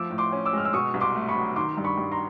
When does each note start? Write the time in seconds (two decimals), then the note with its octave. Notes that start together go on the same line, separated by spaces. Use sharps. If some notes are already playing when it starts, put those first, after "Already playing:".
Already playing: F3 A3 D6 E6
0.10 A2
0.18 C6 D6
0.32 C#4
0.46 D6 E6
0.53 G#3 F6
0.65 E6
0.73 B2 C#6 D#6
0.94 C2
1.00 C6 D6
1.15 A3
1.29 B5 C#6
1.36 F#3
1.56 D#3 C6 D6
1.77 G2
1.84 B5 C#6
1.97 G2
2.11 A#5 C6